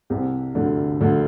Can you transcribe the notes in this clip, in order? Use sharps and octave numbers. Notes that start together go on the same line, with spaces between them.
C2 C3
D2 D3
D2 D3